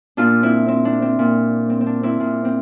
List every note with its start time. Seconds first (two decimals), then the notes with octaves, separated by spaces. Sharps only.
0.17 A#2 D4 F4
0.43 C4 E4
0.68 C4
0.85 D4
1.02 C4
1.19 A#2
1.70 C4
1.81 C4
1.86 D4
2.03 C4 E4
2.20 A#2 D4
2.45 C4